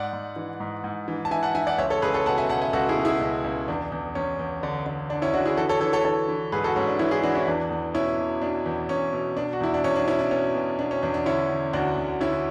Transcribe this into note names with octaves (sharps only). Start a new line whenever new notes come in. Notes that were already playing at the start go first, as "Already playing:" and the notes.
Already playing: G#2 D5 F#5
G#2
E3
G#2
G#2
E3
A5
E3 E5 G#5
F#5 A5
E3 E5 G#5
D5 F#5
C#2 C#5 E5
A4 C#5
C#2 G#4 B4
A4 C#5
B2 F#5 A5
E5 G#5
C#2 F#5 A5
E5 G#5
C#2 F#4 A4
E4 G#4
B2
E4 G#4
C#2
C#2
E2 D4
E2
E2 C#4
E2
D3
D3
D3 D4
C#4 E4
D3 D4 F#4
E4 G#4
E3 F#4 A4
A4 C#5
E3 A4 C#5
A4 C#5
E3 A4 C#5
E3
G#2 G#4 B4
F#4 A4
G#2 C#4
D4
E3 C#4 E4
E4 G#4
E3 D4 F#4
C#4 E4
E2 D4
E2
B2 C#4 E4
B2
B2 D4
E2
E2 C#4
B2
B2 D4
F#4
E2 E4
D4
E2 C#4
D4
B2 C#4 E4
D4
B2 C#4
B2
B2 D4
C#4
E2 D4
D4
D3 C#4 E4
D3
D2 D4 F#4
D2
D3 C#4 E4